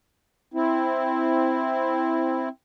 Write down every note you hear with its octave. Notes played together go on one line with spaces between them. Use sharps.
C4 E4